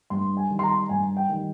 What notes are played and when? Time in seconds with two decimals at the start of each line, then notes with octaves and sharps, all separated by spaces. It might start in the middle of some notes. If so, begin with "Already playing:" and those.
0.10 G2 C6
0.37 G#5
0.50 D#3 G3
0.59 C6
0.63 A#5
0.89 G2 G#5
1.17 G5
1.29 D#3 G3